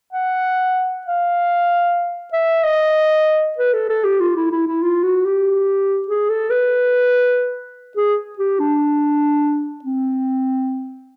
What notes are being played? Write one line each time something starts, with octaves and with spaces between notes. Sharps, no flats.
F#5
F5
E5
D#5
B4
A4
A4
G4
F4
E4
E4
E4
F4
F#4
G4
G#4
A4
B4
G#4
G4
D4
C4